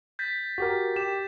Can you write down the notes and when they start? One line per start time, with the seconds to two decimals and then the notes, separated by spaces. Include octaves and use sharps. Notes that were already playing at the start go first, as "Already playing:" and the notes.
0.19 G6 A6 B6
0.58 F#4 G4 A#4
0.96 G4 E7